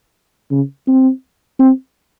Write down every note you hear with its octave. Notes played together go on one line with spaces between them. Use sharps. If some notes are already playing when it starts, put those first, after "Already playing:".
C#3
C4
C4